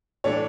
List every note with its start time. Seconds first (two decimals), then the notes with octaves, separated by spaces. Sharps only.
0.24 A2 E3 A3 D4 C#5